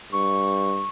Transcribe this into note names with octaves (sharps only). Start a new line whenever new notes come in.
G2 C#6